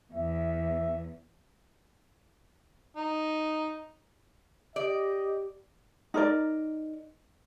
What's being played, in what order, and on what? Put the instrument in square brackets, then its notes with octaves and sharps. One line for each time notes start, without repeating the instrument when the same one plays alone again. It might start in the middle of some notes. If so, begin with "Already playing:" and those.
[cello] E2 [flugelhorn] E5
[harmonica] D#4
[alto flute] G4 [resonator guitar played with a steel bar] D5 [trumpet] D#5
[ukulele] D#4 A#4 D5